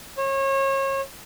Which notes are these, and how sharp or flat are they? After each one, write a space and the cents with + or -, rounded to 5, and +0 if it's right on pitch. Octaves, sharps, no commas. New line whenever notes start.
C#5 -30